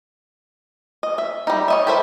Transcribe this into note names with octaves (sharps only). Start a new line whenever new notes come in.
D#5
E5
G3 D#4
C#5 D#5 E5
G4 A4 B4 C5 E5